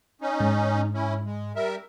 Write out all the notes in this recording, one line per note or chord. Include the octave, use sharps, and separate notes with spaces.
C#4 D#4
G#2
C#4 E4
G#3
G3 A#4 E5